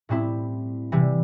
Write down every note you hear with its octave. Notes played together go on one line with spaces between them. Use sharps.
A2 G3 C4 E4
C3 E3 G3